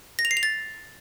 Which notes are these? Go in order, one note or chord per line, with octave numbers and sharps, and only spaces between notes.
A#6
F7
C7
F7
A6